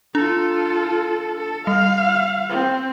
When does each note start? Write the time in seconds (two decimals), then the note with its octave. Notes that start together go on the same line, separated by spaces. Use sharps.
0.15 D4 F4 A4
1.37 A4
1.67 G3 F5
2.49 C4